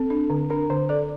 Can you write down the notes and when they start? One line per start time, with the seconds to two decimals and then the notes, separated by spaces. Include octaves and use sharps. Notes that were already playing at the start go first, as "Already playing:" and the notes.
Already playing: C4 A4
0.10 D4
0.30 D3
0.50 D4 A#4
0.70 D3 C5
0.89 A4 D5